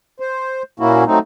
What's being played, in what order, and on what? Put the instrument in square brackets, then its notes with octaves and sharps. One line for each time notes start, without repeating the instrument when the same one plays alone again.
[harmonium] C5
A#2 A#3 C#4 E4 F#4
F#3 A3 C4 D#4